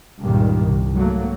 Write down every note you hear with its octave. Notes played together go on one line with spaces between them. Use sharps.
C#2 G2 A#2 D#3 G3
C2
G#2 F#3 A3 A#3